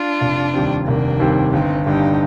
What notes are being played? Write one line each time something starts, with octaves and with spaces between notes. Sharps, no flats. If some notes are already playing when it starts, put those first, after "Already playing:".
Already playing: D4 F4
F1
D#2 D#3 G3 C4
F1 A#3 D4
D#2 D#3 G3 C4
G1 C4 D#4
G2 D3 D#4 G4